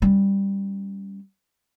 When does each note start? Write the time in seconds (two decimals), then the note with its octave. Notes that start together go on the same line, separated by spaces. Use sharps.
0.02 G3 C#4